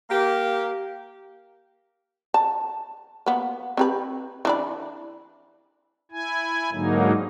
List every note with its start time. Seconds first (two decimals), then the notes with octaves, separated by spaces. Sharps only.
0.10 A#3 G4
2.34 A5
3.26 A#3 B3
3.77 C4 G4 B4
4.45 E3 D4 B5
6.11 E4 G#5
6.73 G#2 D3 F#3 A#3 D#4